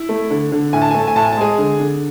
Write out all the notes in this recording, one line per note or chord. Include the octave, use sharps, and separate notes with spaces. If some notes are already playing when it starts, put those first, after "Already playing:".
Already playing: E4
A3
D3
D3
A2 G#5
A5
G#5
A3 A5
G#5
A2 A5
G#5
A5
G#3 G#4 G#5
D3
D3